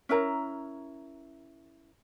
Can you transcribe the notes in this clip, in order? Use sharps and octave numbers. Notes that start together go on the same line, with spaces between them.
C#4 E4 A#4 A#5